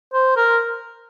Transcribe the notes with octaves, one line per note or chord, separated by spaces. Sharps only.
C5
A#4